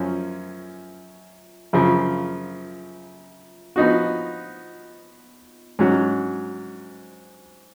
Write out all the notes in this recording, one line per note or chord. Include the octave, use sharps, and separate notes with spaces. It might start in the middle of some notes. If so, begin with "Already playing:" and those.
Already playing: F#2 F3 C#4
F#2 C#3 F3
F3 B3 D#4 F#4
G#2 F#3 C#4 F#4